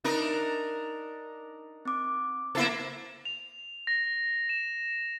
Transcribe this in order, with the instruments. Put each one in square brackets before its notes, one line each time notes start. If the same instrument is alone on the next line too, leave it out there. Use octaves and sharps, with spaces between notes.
[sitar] D4 D#4 A#4
[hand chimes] C4 D6
[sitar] A#3 E4 A4 [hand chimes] C5 A6 C7
[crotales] F7
A#6
E7